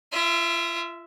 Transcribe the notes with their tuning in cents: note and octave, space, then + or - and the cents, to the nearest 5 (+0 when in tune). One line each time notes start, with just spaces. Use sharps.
F4 -35 E5 +0